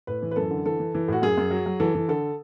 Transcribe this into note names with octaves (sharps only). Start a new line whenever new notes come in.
A2 B4
E3
B4
F#2 A4
D3
E3 A4
E3
E3
A2 F#4
F#2 G#4
F#2
F#3
F#3
E3 A4
E3
D3 A4